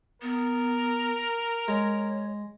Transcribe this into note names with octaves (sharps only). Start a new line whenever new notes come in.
B3 A#4
G#3 C#5